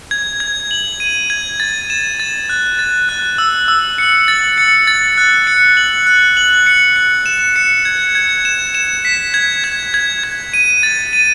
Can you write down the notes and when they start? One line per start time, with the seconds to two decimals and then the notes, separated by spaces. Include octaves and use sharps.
0.11 G#6
0.40 G#6
0.71 F#7
1.00 D#7
1.30 G#6
1.60 A6
1.90 E7
2.20 A6
2.49 F#6
2.79 A6
3.09 F#6
3.38 E6
3.68 E6
3.98 C#7
4.28 A6
4.58 C#7
4.87 A6
5.18 F#6
5.47 C#7
5.77 F#7
6.07 F#6
6.37 F#7
6.66 C#7
6.96 C#7
7.26 E7
7.56 C#7
7.85 G#6
8.15 G#6
8.45 E7
8.75 E7
9.05 B6
9.34 G#6
9.64 G#6
9.94 G#6
10.24 G#6
10.54 D#7
10.83 A6
11.13 D#7